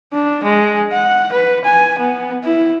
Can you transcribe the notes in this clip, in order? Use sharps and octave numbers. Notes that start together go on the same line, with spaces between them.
D4
G#3
F#5
B4
G#5
B3
E4